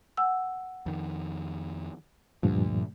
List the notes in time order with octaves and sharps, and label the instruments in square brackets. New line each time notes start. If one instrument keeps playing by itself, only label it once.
[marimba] F#5 G#5 E6
[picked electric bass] F2 D#3
[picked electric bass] D2 [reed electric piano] G2 A#2 F3